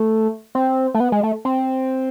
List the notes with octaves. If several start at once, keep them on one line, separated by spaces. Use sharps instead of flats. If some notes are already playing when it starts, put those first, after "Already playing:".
Already playing: A3
C4
A3
B3
G#3
A3
C4